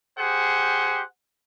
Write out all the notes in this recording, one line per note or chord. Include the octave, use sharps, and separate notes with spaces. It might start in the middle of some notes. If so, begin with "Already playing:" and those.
G4 G#4 C5 F#5